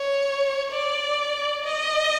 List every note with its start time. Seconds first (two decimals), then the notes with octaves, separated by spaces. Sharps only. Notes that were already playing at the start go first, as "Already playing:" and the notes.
Already playing: C#5
0.72 D5
1.64 D#5